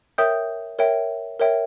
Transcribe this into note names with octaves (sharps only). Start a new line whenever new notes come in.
A#4 C#5 E5 G5 D#6 G6
A#4 C#5 E5 G5
A#4 C#5 E5 G5